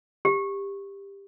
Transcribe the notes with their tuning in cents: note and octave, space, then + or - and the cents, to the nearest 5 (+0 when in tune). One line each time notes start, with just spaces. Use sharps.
G4 +15